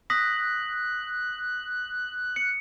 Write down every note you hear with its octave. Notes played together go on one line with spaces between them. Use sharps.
D#6 F#6 A#6 B6
C#7